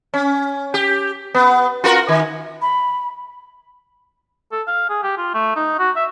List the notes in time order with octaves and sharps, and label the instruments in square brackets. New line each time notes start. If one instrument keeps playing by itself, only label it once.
[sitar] C#4
G4
B3
F4 F#4 A#4
D#3
[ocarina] B5
[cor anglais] A4
F5
G#4
G4
F4
A3
D#4
F#4
E5